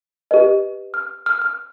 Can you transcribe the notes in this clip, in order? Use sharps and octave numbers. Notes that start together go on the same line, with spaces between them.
G4 B4 D#5
F6
F6
F6